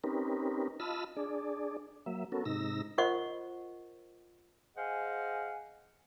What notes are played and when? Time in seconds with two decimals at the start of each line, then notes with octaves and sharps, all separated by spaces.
0.04 C4 C#4 D#4 G4 A#4 B4
0.80 F4 D#5 A5 B5 E6 F6
1.17 D4 G#4 D5
2.06 F#3 A#3 E5
2.32 B3 C#4 F#4 A4 A#4
2.45 G#2 C3 D#4 E6 A#6
2.98 F4 A#4 C5 D#5 F#5 C#6
4.76 G#4 C5 D#5 F5 F#5 G#5